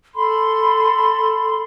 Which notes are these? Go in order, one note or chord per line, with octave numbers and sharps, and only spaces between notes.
A4 B5 C6